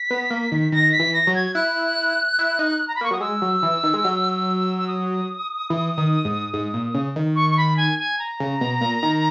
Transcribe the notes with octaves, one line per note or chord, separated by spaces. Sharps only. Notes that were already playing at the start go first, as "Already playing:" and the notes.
Already playing: B6
B3
A#3
D#3
D#3 A#6
B6
E3
A#6
F#3
G#6
E4 F#6
E4
D#4
A#5
B5
A#3 C#6
F#3 D#6
G#3 E6
F#3
E3
D#3
G#3
F#3
E6
D#6
E3
D#3
G#2
G#2
A#2
C#3
D#3
C#6
C#6
B5
G#5
G#5
A#5
C#3
B2
A#2
D#3